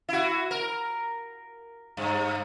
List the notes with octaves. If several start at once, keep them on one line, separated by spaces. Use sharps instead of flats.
E4 F#4
A#4
G2